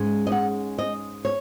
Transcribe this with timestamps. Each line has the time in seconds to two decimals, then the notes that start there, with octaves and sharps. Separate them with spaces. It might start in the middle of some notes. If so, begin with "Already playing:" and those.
Already playing: G#2 G#3 C#4
0.27 D#5
0.32 F#5
0.78 D#5
1.25 C#5